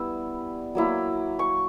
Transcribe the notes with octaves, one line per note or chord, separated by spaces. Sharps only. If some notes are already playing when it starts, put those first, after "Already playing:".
Already playing: G3 B3 E4 E6
F#3 A#3 E4
C#6